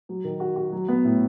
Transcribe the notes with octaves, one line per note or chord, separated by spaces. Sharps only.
F#3
D#3
F#4
F#4
F#3
B3
A2